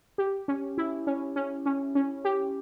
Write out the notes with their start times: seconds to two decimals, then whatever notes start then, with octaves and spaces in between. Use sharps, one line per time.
0.18 G4
0.48 C#4
0.78 E4
1.07 C#4
1.36 C#4
1.66 C#4
1.95 C#4
2.25 G4